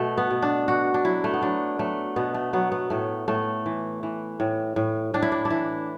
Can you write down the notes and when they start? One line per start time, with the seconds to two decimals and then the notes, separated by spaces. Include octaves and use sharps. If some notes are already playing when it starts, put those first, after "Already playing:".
Already playing: B2 A3
0.17 B3
0.30 B2
0.42 D4
0.68 B2 F#4
0.94 D4
1.04 F#3 E4
1.24 A3
1.34 B3
1.41 F#3 D4
1.79 F#3 A3
2.16 B2 B3
2.34 A3
2.53 F#3 B3
2.72 B3
2.90 A2 A3
3.28 A2 A3
3.66 E3
4.03 E3
4.40 A2
4.76 A2
5.14 A2 D4
5.22 E4
5.32 D4
5.45 D4
5.50 E3 E4